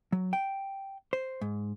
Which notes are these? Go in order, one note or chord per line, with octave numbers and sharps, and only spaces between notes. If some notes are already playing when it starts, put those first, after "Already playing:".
F#3
G5
C5
G#2